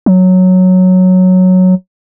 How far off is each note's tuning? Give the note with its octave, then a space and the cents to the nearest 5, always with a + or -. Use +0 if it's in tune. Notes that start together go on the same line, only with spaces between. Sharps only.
F#3 -5